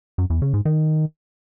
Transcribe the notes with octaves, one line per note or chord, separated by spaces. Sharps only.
F#2
E2
C#3
G#2
D#3